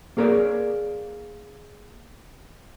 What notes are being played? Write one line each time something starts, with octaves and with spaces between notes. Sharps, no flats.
A#3 G#4 A#4 C#5 D5